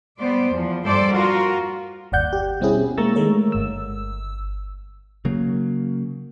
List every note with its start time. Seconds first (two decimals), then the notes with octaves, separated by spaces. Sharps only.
0.19 G3 B3 C5 D5
0.51 E2 F3
0.85 G2 G3 A4 C5 D5
1.14 F4 F#4 A#4
2.12 G1 D#2 D5 F#5 G6
2.33 G4
2.60 B2 G3 C4 C#4 E4 G#4
2.98 G#3 A#3 A#5 C#6 E6 A6
3.16 D#3 G#3 A3 A#4 C#5
3.52 G1 E6
5.25 C#3 F#3 A#3